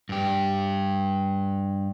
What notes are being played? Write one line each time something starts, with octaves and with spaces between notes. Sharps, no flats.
G2 G4